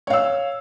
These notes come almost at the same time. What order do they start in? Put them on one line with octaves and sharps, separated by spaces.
C#5 F5 E6